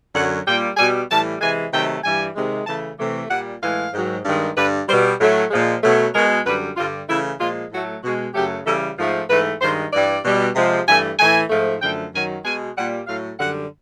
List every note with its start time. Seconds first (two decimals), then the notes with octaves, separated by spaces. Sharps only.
0.14 F#2 D3 F#3 F#5
0.45 A#2 G3 G5
0.77 B2 G3 G#5
1.10 A2 E3 G3 A5
1.40 C3 E3 G#3 G#5
1.72 C3 D#3 F#3 A3 G5
2.03 G2 E3 G3 G#5
2.35 C3 D#3 G#3
2.66 C#3 E3 A3 A5
2.99 C3 E3 A3
3.30 A#2 G3 F#5
3.61 A2 E3 G#3 F5
3.93 G#2 D#3 F#3
4.24 G2 D#3 G#3
4.56 G2 D3 G3 B4
4.87 G3 C5
4.92 B2
5.19 A2 F#3 A3
5.50 A#2 F3 G#3
5.82 B2 F#3 A3
6.14 B2 G#3 A#4
6.45 F#2 D3 G3 B4
6.76 G2 D3 G3 F4
7.08 C#3 E3 A3 E4
7.40 A#2 F3 G#3 F4
7.71 A2 F#3 A3 F#4
8.02 B2 G#3 F#4
8.34 F#2 C#3 F#3 A3 G4
8.65 C#3 E3 G3 A4
8.98 G#2 F3 A3
9.29 G#2 E3 A3 B4
9.60 G2 D#3 G#3 C5
9.92 G2 E3 G3 D5
10.24 B2 G3
10.55 C3 F3 G#3
10.87 G2 E3 A3 G#5
11.18 A2 E3 A3 G#5
11.50 G#2 F3 A3
11.81 F#2 D3 F3 A3 G5
12.13 F#2 D#3 F#3 G#5
12.44 B2 G#3 G#5
12.76 A#2 G3 F#5
13.07 A2 F#3 A3 F5
13.39 F#2 D3 G3 F#5